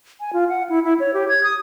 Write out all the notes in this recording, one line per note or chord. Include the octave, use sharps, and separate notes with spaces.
G#5
F4
F#5
E4
E4
C#5
G4
G#6
D#6